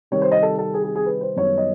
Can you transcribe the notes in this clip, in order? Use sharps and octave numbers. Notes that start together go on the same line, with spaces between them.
C3 D#3 G3 C#5
C5
D#5
A4
A4
G#4
G#4
G#4
B4
C5
F#2 D#3 G3 B3 C#5
D#5